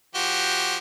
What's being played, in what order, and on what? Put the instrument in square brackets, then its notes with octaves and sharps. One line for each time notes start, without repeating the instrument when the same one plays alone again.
[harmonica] F3 F#4 G4